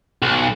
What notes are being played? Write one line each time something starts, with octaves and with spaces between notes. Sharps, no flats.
B1